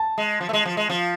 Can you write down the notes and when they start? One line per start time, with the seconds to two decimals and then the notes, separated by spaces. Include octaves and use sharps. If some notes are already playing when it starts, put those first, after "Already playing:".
Already playing: A5
0.18 G#3
0.41 F3
0.49 A3
0.53 G#3
0.65 F3
0.77 G#3
0.90 F3